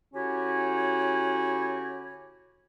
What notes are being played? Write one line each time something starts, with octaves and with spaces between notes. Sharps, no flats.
D3 C#4 E4 F#4 G4 C#5